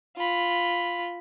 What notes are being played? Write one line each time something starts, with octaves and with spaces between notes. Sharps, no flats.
F4 B5